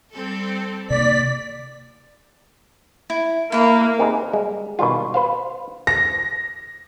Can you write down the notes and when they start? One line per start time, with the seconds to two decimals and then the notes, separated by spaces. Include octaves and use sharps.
0.13 G3 C4 A4
0.90 C3 D#3 A#3 D5 B6
3.10 E4
3.52 A#3 E4 B4
3.99 A#3 C4 D#4 G4 G#4
4.33 G3 G#3
4.79 B2 D#3 G3 F4
5.14 B4 C5 F5
5.87 A#6